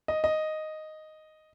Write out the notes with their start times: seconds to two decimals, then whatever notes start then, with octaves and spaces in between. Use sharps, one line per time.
0.08 D#5
0.24 D#5